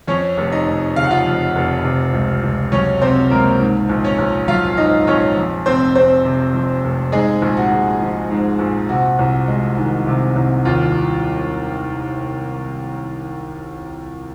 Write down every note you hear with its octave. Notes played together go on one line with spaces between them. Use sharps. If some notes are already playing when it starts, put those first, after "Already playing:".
F2 C#4 C#5
F1
D#4 D#5
F1
C#3 F5
F#5
F4 F5
F2
F1
C3
C#2
C#2
F#3 C#4 C#5
C3 C4 C5
C#2 A#3 A#4
G#2
A#1
C#4 C#5
A#1
F#3 F4 F5
G#2 D#4 D#5
A#1 C#4 C#5
F2
F1 C4 C5
F1 C4 C5
C3
F2
F1
G#2 G#3 G#4
A#1
F#4
A#1
F3
G#2
A#1
C3 F#4
C2
G#3
D#3
C3
C2
D#2 F4